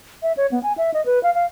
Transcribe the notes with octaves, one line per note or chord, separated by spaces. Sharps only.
E5
C#5
B3
G#5
E5
D#5
B4
F5
F5